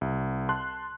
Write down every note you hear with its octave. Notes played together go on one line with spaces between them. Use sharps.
C2
A5 C6 F#6